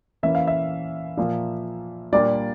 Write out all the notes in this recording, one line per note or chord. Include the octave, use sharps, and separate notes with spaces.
E3 A#3 C#4 E5
F5
E5
A#2 F3 A#3
A#2 G3 A#3 D4 D5